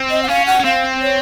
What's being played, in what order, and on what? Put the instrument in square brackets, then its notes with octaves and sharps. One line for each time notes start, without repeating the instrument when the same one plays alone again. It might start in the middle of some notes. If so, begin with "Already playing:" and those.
Already playing: [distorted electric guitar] C4
[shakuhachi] D#5
F#5
[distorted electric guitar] C#4 [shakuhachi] F5
[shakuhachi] F#5
[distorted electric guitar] C#4
[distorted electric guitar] C4 [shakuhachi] F5
[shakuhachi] C#5